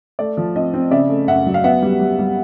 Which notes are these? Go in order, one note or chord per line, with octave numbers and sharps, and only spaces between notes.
A3 D5
F3
C4 D#5
C4
C#3 D5 E5
A3
F#2 E5 F#5
F#3
F5
B3 E5 F#5
G3
G3
G3